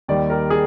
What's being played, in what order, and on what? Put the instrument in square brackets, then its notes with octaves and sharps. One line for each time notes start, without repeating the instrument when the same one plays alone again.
[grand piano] D#2 D#3 G3 D5
A#4
G#4